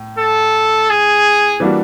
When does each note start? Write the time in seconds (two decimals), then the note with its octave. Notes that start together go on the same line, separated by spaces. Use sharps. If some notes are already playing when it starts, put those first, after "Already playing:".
Already playing: A2
0.18 A4
0.90 G#4
1.60 E3 G3 A#3 D4 F#4